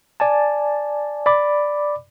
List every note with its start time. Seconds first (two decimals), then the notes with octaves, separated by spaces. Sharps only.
0.20 D5 G#5 A5
1.26 D5 B5 D6